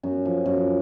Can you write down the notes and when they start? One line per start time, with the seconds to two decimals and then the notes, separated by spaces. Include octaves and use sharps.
0.03 F#2
0.25 F3
0.46 F#2